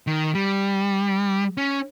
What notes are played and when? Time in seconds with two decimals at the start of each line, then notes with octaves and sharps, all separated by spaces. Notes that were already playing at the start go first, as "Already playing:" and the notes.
0.07 D#3
0.35 G3
1.57 C#4